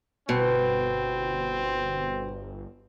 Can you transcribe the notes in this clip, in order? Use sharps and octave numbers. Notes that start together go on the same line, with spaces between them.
G1 B2 C4